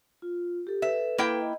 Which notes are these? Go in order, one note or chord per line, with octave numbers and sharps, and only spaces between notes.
F4
G4 A4
A4 B4 E5
A#3 E4 G5
D#5